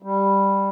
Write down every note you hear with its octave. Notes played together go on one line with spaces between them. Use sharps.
G3